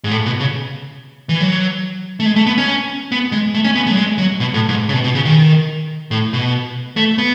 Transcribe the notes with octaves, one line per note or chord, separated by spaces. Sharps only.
G#2
A2
B2
C#3
E3
F#3
A3
G#3
A3
B3
C#4
B3
G#3
A3
C#4
B3
A3
F#3
G#3
F#3
B2
A2
G#2
C#3
B2
B2
C#3
D#3
A2
B2
A3
B3